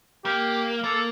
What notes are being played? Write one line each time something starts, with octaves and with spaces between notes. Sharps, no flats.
A#3 G4
A#3 A4
A4